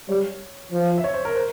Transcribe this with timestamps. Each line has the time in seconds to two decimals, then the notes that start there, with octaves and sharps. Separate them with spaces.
0.09 G3 C#5
0.72 F3
0.98 E5
1.04 C#5
1.14 C5
1.25 A#4
1.35 C5